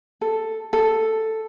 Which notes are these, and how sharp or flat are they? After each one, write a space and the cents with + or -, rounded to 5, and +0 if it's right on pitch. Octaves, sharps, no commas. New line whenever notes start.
A4 +5
A4 +5